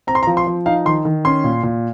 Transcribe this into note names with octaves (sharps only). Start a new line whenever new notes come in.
C4 A#5
C6
A#5
F3
C6
F3
D#4 F5
D#3 C6
D#3
C#4 C6
A#2
A#2